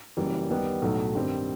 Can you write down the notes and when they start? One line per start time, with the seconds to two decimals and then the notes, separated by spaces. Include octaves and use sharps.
0.17 F#1 F#2 E3 G3
0.49 D#2 D#3 G3 B3 D#4
0.82 B1 A2 F#3 A3
1.15 G2 D#3 G3 C4